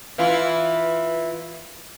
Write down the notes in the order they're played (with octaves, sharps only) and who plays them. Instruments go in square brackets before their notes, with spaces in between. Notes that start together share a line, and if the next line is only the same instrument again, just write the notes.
[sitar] E3 E4 F4